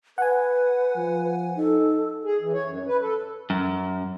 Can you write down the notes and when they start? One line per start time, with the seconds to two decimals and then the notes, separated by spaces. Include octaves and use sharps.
0.18 B4 F#5 G#5
0.96 F3
1.57 D#4 A4
2.25 G#4
2.41 E3
2.53 C#5
2.65 F#2
2.87 B4
3.02 A4
3.50 F#2